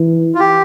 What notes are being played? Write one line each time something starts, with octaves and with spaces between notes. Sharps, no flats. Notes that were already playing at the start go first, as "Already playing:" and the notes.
Already playing: E3
F4
G4